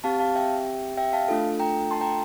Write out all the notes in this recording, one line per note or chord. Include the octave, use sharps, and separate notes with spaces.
C4 G4 F5 A5
F5 A5
E5 G5
E5 G5
F5 A5
A3 D4 F4 A4
G5 A#5
A5 C6
G5 A#5